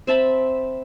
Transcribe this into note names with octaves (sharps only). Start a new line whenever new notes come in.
C4 E5 A5 B5